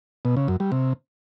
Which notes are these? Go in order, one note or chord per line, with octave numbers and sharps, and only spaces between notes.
B2
C#3
F#2
G3
C3